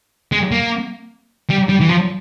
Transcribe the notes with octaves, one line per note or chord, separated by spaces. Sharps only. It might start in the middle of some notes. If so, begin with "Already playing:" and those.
G#3
A#3
G3
G3
E3
F3